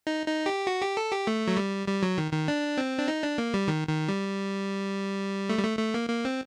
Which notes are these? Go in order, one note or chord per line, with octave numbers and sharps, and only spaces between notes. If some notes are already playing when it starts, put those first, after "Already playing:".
D#4
D#4
G4
F#4
G4
A4
G4
A3
F#3
G3
G3
F#3
D#3
D#3
D4
C4
D4
D#4
D4
A#3
G3
D#3
D#3
G3
A3
G3
A3
A3
A#3
A#3
C4